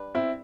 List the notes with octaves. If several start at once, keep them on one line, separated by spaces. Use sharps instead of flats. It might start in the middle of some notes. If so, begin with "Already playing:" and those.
Already playing: G3 D4 B4
C4 E4